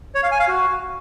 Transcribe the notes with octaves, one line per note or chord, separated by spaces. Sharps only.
C#5
F5
G#5
F5
F#4